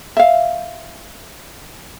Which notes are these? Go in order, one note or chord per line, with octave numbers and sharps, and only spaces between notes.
E5 F5